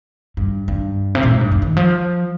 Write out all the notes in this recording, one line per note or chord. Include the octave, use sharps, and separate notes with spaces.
G2
G2
C3
A#2
G#2
G2
G2
D#3
F3